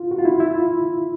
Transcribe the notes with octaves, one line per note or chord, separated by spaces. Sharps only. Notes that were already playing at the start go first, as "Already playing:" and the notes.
Already playing: F4
F#4
F4
E4
E4
F4